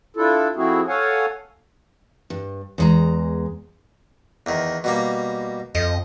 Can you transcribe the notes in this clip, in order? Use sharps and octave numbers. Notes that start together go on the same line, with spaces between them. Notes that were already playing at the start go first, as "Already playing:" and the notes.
D4 E4 F4 A4
F3 A3 C4 E4 F#4 G#4
A4 C#5 F5 F#5 G#5
G2
E2 G#3 A#5
E2 D#3
B2 G3 A#3
F2 D#5